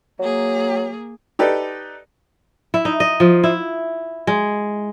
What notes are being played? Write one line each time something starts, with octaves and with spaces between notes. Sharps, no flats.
F#3 A#3 G#4
D#4 G4 A4 B4 D5
E4
D#4
D#5
F3
E4
G#3